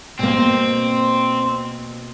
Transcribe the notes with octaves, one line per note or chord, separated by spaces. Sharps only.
B2 A#3 C4